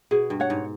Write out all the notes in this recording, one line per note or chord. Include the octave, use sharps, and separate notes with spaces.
B2 G#4
G2
C#5 F#5
G#2